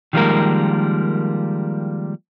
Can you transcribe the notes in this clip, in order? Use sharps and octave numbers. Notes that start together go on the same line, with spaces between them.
D#3 F3 G3 G#3 A#3 A#4